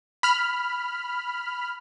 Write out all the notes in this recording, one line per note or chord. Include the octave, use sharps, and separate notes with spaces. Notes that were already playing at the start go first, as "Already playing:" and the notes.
B5 F6